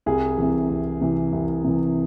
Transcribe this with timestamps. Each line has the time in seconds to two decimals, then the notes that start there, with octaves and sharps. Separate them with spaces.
0.06 C2 G#4
0.38 C3 E3
0.69 C2
1.01 C3 E3
1.33 C2
1.64 C3 E3